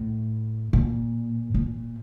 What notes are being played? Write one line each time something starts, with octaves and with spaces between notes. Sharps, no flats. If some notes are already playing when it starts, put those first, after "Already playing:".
Already playing: A2
A#2
A#2